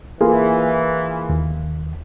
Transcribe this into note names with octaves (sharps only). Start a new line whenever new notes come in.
E3 A#3 F4 G#4
D#2